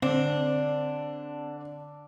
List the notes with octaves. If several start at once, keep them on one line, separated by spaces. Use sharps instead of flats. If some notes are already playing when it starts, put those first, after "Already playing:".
D3 C4 D4